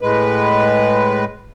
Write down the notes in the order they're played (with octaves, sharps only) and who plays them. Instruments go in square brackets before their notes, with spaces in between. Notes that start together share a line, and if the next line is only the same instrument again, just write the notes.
[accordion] A2 G#3 B4